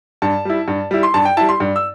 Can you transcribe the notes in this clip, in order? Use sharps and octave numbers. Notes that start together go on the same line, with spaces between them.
G2 A5
G3 E4
G2
G3 E4
C6
G2 A5
G5
G3 E4 A5
C6
G2
E6